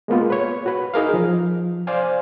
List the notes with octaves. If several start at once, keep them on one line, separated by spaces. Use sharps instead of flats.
G#3 A#3 B3 F4
B4 C#5
F#4 B4
D#4 G#4 A#4 F5
F3
C5 D5 F5 G#5